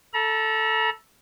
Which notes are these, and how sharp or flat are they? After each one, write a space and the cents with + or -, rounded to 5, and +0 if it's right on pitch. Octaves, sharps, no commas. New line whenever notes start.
A4 +0 A#5 +40